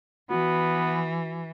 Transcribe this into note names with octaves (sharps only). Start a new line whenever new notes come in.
E3 B3 F#4